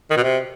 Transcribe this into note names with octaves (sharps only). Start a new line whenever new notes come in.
D#3
B2
C3